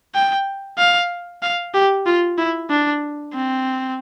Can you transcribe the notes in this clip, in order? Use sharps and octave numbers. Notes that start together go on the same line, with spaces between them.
G5
F5
F5
G4
F4
E4
D4
C4